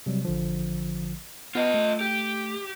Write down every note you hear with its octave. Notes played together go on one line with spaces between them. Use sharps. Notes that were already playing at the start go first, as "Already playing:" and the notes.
C3 F#3 G3
A1 D3 F3
B3 F4 B4 D#5
A3
G4